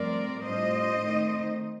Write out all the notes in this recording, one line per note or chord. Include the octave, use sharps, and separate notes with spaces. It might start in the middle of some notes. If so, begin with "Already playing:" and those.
Already playing: G2 F3 A3 C4 A#4 D5
A2 G3 D4 F4 C5 D#5
D#3 A3 C4 D#4